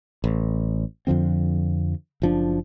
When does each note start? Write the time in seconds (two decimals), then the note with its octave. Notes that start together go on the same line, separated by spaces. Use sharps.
0.24 A1
1.07 F2 D3 F3 C4
2.22 F#1 F3 D4